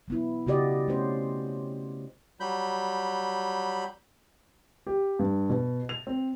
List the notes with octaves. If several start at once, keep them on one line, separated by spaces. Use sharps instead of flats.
F#3 B3 E4
C#3 F#4 G4 D5 D#5
A3 C#4 C5
F#3 G3 B5 G6
G4
G2
B2
F7
C4